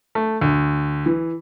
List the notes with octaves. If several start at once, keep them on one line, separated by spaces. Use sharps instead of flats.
A3
D2
E3